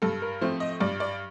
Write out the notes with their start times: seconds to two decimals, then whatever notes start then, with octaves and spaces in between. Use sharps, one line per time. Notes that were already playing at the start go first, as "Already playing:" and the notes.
0.02 G2 A4
0.22 A#4
0.41 F3 A3 C4 C5
0.60 D#5
0.80 G2 D5
1.00 D5